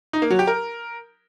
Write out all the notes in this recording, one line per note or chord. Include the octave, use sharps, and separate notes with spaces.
D#4
A#3
F#3
G4
A#4